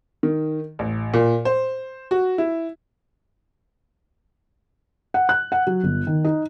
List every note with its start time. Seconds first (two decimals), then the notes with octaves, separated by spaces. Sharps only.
0.23 D#3
0.79 A1
1.14 A#2
1.45 C5
2.11 F#4
2.38 E4
5.14 F#5
5.29 F#6
5.52 F#5
5.67 F#3
5.83 G1
6.07 D#3
6.24 D#4